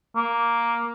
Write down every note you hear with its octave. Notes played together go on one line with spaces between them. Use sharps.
A#3